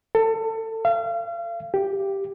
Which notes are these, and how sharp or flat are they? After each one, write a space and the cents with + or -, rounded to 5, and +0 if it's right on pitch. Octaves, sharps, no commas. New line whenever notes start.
A4 +25
F5 -35
G4 +0